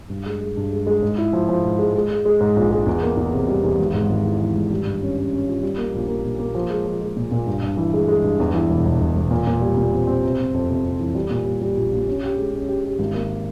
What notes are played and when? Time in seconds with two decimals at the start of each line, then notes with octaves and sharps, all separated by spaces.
0.10 G2
0.26 G#3
0.41 G#3
0.57 G2
0.72 G#3
0.87 G#3
1.02 G#2
1.18 E4
1.33 F3
1.49 F3
1.64 G#2
1.79 G#3
1.94 G#3
2.10 G#3
2.25 G#3
2.40 G#2
2.56 A#1
2.71 G#3
2.86 E2
3.02 A#3
3.17 E2
3.33 C3
3.48 G3
3.64 E2
3.79 G#1
3.93 G#2
4.09 G#1
4.25 E3
4.40 E3
4.56 G#1
4.70 G3
4.86 G2
5.02 C#4
5.17 C#4
5.33 C#4
5.48 F4
5.63 G3
5.78 A#3
5.94 A#1
6.08 A#3
6.24 A#2
6.39 A#3
6.55 F3
6.70 G#3
6.86 F3
7.01 G#3
7.16 A#2
7.32 A#2
7.47 G2
7.62 G2
7.77 E3
7.94 G#3
8.08 G#3
8.24 G2
8.40 E2
8.54 E3
8.70 E1
8.85 E1
9.01 E1
9.15 E1
9.31 A#2
9.47 A#2
9.61 G3
9.77 A#2
9.93 C4
10.07 C4
10.23 C3
10.39 C3
10.54 F2
10.69 C3
10.85 C3
10.99 E3
11.15 G3
11.30 A#2
11.46 G3
11.61 G3
11.77 A#1
11.92 A#1
12.08 C#4
12.23 G4
12.38 G#3
12.54 C#4
12.68 G4
12.84 G4
12.99 G#1
13.14 A#3